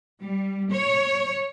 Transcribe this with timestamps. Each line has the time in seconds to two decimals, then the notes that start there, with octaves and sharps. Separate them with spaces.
0.22 G3
0.73 C#5